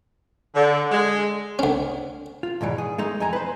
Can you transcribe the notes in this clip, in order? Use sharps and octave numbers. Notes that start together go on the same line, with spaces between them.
D3
G#3
D2 C#4
F4
E2 G#2 B2 E3
G#4
G#3 A3 D#4
F2 E3 G#5 A#5
B4 C5